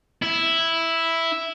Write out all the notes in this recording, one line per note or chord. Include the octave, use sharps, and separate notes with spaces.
E4